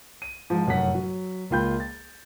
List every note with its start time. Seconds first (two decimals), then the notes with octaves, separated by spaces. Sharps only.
0.22 D#7
0.50 G#2 F3
0.67 F1 F#2 A2 A3 F#5 B6
0.95 F#3
1.50 C#2 A#3 F4 G5 B5 G6
1.80 A6